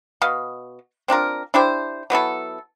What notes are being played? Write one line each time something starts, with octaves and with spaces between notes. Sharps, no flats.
B2 D#5 F5
C4 D4 F4 A#4
D4 E4 G4 C5
F#3 B3 E4 A4